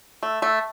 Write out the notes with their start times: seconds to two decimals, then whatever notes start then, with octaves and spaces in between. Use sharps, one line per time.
0.23 A3
0.42 A3